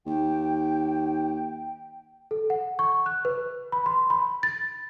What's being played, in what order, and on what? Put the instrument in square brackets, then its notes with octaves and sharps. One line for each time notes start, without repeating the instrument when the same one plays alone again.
[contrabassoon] D#2 [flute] G5
[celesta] A4
F#5
C#6
F#6
B4
B5
C6
B5
A6